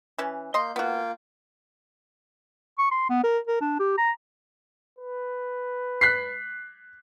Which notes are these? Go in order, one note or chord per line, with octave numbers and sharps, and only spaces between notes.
E3 C#4
A#3 D#5 C6 G6
A#3 B3 F4 F#4 G5
C#6
C6
B3
A#4
A#4
D4
G4
A#5
B4
F#6 B6 C7